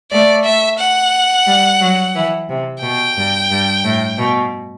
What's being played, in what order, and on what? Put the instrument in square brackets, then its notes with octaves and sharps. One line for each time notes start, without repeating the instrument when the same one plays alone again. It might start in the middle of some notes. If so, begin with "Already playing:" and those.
[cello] A3 [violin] D5
[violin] E5
F#5
[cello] G3
F#3
E3
C3
[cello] B2 [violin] G5
[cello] G2
G2
A2
B2